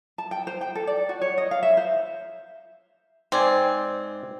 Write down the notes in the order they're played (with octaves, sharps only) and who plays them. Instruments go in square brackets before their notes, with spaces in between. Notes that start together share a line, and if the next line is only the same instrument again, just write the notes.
[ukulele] A5
G5
C5
G5
A4
D5
F#4
C#5
D#5
F5
E5
C5
[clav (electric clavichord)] G#2 D5 G#5 [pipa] C4